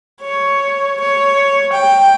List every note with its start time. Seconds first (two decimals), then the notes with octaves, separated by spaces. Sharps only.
0.22 C#5
1.01 C#5
1.73 G5